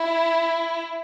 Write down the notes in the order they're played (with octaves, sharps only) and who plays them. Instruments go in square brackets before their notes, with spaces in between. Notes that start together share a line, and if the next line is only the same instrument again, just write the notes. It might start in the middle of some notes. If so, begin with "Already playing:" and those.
Already playing: [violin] E4